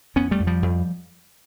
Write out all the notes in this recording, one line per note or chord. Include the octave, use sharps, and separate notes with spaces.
F2 B3 C#4
G3 A3
F2
F3 G3
F2